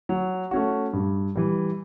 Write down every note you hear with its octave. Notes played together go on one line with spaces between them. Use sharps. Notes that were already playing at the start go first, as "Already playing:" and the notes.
F#3
A3 C#4 F#4
G2
E3 G3